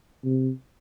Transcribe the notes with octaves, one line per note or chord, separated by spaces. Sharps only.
C3